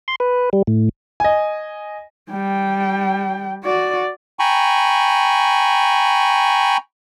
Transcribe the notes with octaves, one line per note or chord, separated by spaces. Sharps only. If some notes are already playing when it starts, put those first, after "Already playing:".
C6
B4
G3
A2
D#5 G#5
G3 G5
F#4 D5
G5 G#5 A#5 B5 C#6